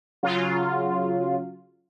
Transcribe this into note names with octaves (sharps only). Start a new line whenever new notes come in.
C#3 F#3 F4